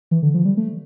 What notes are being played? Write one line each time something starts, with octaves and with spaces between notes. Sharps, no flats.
E3
D3
F3
G3
A3